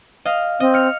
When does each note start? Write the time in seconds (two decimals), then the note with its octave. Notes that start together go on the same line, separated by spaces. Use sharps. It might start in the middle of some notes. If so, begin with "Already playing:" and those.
0.25 D#5 F5
0.60 C4 D#5
0.74 F6 C#7